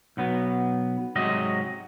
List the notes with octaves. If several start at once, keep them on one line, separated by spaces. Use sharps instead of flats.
B1 F#3 B3
G#2 C3 F#3 D#5